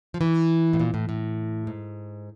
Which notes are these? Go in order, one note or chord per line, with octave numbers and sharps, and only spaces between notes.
F3
E3
A2
A#2
A2
A2
G#2